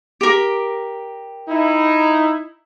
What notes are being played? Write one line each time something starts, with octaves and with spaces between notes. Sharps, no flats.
G4 A#4
D#4 E4